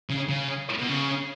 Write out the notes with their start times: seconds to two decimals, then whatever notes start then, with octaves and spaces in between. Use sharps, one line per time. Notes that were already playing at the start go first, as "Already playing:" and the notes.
0.10 C#3
0.29 C#3
0.79 B2
0.89 C#3